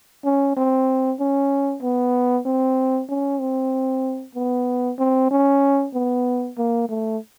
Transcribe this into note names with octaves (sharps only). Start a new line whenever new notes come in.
C#4
C4
C#4
B3
C4
C#4
C4
B3
C4
C#4
B3
A#3
A3